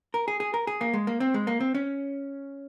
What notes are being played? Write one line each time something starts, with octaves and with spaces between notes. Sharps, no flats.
A#4
G#4
G#4
A#4
G#4
A#3
G#3
A#3
C4
G#3
A#3
C4
C#4